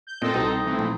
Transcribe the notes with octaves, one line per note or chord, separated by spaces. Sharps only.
G6
A#2 C4 A4 D#5
C2 B2 D#4
D#4
E3 A3 C4
A#1